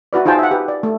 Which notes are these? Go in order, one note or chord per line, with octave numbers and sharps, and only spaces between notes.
E4 F#4 B4 D5
D#4 F4 G#4 C5 G5 A5
E5 F#5
G4 B4
D5
A3